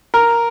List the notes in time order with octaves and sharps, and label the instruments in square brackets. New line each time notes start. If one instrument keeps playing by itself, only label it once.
[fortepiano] A#4